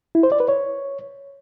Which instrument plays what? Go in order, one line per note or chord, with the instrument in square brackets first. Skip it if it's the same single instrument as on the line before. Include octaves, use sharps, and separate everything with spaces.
[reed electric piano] E4
C5
D5
B4
C#5